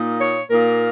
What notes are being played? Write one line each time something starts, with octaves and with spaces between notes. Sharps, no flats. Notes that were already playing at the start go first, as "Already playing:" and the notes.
Already playing: A#2 A#3 D#4
C#5
A#2 A#3 D#4 A#4